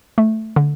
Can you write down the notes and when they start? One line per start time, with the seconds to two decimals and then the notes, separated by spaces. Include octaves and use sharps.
0.18 A3
0.56 D3